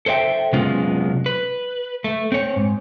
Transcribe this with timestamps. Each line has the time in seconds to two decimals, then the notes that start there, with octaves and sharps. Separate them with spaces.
0.06 A4 C5 E5 G5
0.53 C3 F#3 G#3 B3 C#4 F4
1.26 B4
2.04 A3
2.32 C4 C#5
2.56 G#2